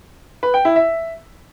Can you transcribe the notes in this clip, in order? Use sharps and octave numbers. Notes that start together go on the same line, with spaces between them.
B4
G5
E4
E5